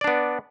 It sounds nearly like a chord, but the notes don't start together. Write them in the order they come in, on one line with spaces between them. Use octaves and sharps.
D5 D4 B3